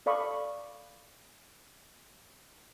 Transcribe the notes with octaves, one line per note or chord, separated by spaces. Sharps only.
A4 D5 F5 B5 C#6 D#6